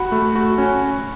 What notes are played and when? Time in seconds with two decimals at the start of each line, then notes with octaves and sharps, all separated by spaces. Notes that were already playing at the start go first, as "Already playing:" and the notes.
Already playing: F#4 F#5 B5
0.12 A3
0.35 F#4
0.58 C#4